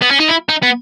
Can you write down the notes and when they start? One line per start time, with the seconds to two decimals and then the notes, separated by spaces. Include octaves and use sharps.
0.02 B3
0.11 C#4
0.20 D#4
0.29 E4
0.49 D#4
0.63 B3